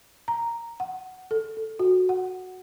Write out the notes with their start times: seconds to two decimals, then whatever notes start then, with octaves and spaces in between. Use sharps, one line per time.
0.28 A#5
0.80 F#5
1.31 A4
1.57 A4
1.79 F#4
2.09 F#5